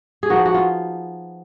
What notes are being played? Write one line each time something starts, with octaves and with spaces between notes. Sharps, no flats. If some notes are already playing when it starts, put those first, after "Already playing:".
G#4
F3 B3 D#4 F#4
F#4
F4